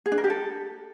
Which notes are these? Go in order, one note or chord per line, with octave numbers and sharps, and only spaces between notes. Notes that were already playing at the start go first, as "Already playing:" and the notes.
G#4
D4
A#4
G4
A4